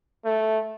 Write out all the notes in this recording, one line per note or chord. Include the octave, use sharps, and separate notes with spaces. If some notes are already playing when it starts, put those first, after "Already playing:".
A3